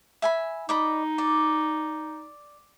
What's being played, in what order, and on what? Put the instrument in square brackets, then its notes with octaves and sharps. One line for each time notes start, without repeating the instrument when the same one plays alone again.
[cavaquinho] E5 G#5 B5
[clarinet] D#4 [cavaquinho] D5 D#5 B5
[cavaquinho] D5